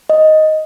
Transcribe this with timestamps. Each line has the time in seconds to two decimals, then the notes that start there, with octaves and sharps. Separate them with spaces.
0.10 D#5